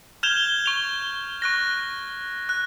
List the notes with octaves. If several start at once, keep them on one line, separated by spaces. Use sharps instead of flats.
F6 G6 G#6 E7 F7 G7
C#6 F7
C#6 F#6 A#6
F#6